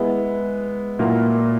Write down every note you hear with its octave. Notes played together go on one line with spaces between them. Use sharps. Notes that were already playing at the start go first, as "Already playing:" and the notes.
Already playing: G#3 B3 E4
A#2 F#3 A#3 E4 A#4